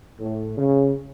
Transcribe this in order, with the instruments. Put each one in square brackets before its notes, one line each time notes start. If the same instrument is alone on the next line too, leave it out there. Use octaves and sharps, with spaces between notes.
[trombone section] A2
C#3